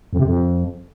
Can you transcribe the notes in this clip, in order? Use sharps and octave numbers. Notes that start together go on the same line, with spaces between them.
F2
C3
F2